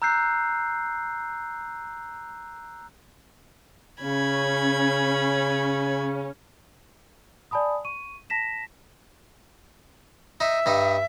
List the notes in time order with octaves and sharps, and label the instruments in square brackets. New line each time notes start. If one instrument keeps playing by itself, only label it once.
[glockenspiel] A#5 E6 F#6 G6 C7
[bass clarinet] C#3 [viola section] C#4 [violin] B5 G#6
[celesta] D5 G#5 A5 B5 D#6
C#6 D#7
A5 A#6 B6 E7
[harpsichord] D#4 [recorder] E5
[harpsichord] G2 D#4